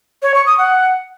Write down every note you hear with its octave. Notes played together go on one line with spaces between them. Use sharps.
C#5
C#6
D#6
F#5